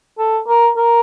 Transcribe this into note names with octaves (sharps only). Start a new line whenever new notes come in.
A4
A#4
A#4